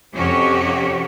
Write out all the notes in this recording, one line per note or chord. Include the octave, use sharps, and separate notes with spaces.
F2 C3 C#4 F#4 G4 C#5